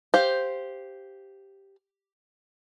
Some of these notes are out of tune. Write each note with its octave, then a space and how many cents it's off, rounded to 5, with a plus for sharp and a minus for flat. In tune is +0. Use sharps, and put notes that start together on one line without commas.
G4 +0 C5 +0 F5 +0